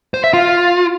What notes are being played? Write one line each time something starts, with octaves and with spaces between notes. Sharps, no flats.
C5
E5
F4